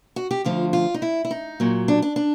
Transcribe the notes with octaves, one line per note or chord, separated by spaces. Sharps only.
F#4
G4
D2 D3 F3 F4
F4
D#4
E4
E4
D#4
A#2 F#3
D4
D4
D4